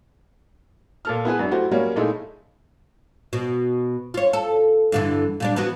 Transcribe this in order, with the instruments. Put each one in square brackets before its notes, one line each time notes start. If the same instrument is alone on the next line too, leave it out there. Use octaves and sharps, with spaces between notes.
[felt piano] A#2 A4 F6
B3 E4 G#4 B4
F#2 D4
A3 E4 F#4 G4 C5
F#3 G3 A#3 C#4 F4
A#2 G#3 A3 D#4 E4
[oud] B2
F4 C#5
A4
G2 D3 E3
A#2 G3 D4
E3 B3 F#4